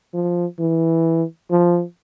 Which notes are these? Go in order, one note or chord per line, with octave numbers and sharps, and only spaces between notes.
F3
E3
F3